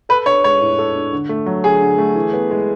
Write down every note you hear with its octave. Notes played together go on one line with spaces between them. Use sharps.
A4 B4
D4 C#5
G#3 C#5
A2
A4
D4
D3
A3
F#3
D3 G#4
D3
A3
E3
B3
G#3